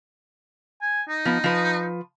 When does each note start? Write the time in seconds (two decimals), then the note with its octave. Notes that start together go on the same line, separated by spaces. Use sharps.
0.82 G#5
1.08 D#4
1.25 F3 B3
1.44 F3 B4